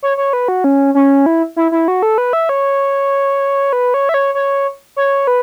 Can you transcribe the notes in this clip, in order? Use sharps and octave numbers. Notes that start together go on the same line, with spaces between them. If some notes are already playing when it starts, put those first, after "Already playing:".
C#5
C#5
B4
F#4
C#4
C#4
E4
E4
E4
F#4
A4
B4
E5
C#5
B4
C#5
E5
C#5
C#5
C#5
B4